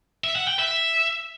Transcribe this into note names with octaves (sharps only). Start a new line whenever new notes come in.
E5
F#5
G5
E5